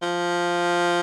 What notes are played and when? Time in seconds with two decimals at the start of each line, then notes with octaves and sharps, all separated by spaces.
0.02 F3